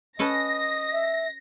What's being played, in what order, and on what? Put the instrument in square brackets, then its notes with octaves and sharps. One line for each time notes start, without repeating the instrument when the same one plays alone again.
[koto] C#4 A4 B4 [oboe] D#5 [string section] A#6
[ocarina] E5